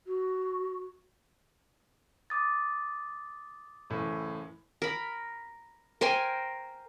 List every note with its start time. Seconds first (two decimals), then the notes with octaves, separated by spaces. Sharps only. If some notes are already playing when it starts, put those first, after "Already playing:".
0.07 F#4
2.30 D6 D#6 A6
3.90 F#1 A2 E3
4.82 A#4 B5
6.01 A#4 C5 G5 G#5